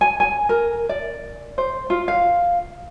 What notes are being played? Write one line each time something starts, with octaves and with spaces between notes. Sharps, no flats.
G#5
G#5
A#4
D5
C5
F4
F5